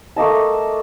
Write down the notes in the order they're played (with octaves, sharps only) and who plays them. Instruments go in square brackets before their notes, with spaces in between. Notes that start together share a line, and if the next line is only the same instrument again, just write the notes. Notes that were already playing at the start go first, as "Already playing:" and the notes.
[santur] A3 A#3 D#5 A5